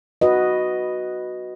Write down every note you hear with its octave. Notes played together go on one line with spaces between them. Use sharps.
F#4 B4 D#5